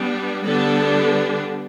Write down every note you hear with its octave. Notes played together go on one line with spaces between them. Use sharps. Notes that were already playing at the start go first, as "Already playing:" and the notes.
Already playing: G3 B3 D4
D3 G3 B3 D4 A4